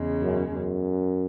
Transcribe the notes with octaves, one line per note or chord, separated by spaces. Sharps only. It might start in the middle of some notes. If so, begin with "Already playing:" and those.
Already playing: E2 C#3 G#3
F#2
F#2